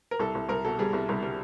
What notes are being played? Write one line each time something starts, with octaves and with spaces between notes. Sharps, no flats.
A#4
C2 A4
C2
C2 A#4
B2 A4
G3 G#4
C2
C2
G3